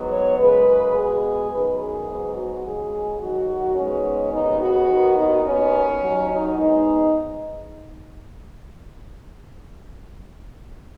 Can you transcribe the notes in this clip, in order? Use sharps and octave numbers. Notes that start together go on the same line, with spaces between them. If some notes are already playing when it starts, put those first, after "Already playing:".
Already playing: G#2 F#3 B3
C#5
F#2 C#3 G#3 B4
B2 G#3 B3 G#4
F#2 D#3 B3 B4
G#4
G#2 F#3 B3
F#4
D#2 C#3 G#3 G#4
D#2 D#3 F#3 F#4
G#2 D#3 G#3 B3 C#4
D#2 C#3 B3 D#4
F#4
D#2 D#3 B3
D#4
D#2 D#3 B3 C#4
D#2 D#3 F#3
D#4
G#2 G#3 B3 D#4